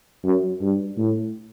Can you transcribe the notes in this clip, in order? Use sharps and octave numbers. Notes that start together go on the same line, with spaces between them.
F#2
G2
A2